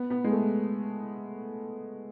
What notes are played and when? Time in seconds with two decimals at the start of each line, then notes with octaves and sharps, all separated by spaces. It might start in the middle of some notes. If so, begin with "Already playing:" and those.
Already playing: B3
0.10 B3
0.24 G#3
0.31 A3